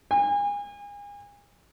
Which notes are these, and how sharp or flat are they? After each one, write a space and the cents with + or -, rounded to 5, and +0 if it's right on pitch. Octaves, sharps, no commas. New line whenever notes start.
G#5 -35